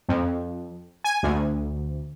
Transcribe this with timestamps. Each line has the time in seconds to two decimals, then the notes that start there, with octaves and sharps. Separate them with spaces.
0.09 F2
1.04 G#5
1.23 D2